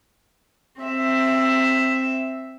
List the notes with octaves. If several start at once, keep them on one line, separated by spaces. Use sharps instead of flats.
C4 E5